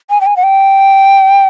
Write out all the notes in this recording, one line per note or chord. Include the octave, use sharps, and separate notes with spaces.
G#5
G5
G#5
F#5
G5